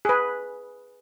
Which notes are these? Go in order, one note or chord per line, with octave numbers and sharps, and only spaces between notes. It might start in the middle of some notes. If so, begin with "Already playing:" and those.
G#4 B4